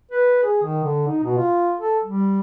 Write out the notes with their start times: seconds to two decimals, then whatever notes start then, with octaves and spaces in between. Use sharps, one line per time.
0.11 B4
0.43 G#4
0.63 D#3
0.83 D3
1.07 D#4
1.23 B2
1.37 F4
1.80 A4
2.04 G3